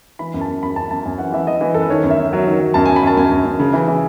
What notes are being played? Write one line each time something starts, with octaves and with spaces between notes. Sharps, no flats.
E3 B5
F#2
A5
F#2
F#2 B5
F#2 A5
F#2 A5
F#2 G#5
E3 F#5
E3 E5
E3 D#5
E3
F#2 A4
B4
D#3 C#5
F#2
E5
F#2
F#3
D#3
F#3
F#2 A5
F#2 G#5
B5
F#2 A5
F#2 G#5
F#2
F#2
C#3
E3
E3